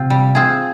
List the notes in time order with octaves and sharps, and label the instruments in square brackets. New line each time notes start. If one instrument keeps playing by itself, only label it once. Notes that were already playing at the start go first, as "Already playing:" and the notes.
Already playing: [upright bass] C3 [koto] C4 F4
[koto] G3
C4 F4 G#4